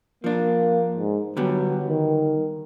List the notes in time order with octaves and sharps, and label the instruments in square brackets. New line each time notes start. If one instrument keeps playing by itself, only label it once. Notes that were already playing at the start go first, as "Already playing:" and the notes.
[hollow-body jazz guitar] F3 D4 [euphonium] A#3
[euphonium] G#2
[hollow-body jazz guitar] D3 G3 B3 [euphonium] F#3
[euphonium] D#3